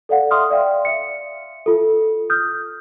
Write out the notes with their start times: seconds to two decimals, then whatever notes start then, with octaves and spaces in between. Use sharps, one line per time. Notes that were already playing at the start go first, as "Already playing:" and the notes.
0.09 A4 D5 F5 F#5
0.31 E5 C6 D#6 F6
0.50 D5 E5 F5 G5
0.85 E5 C#7
1.66 F4 A4
2.30 D#6 F6 G6